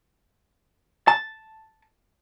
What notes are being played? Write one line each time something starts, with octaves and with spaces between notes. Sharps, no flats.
A5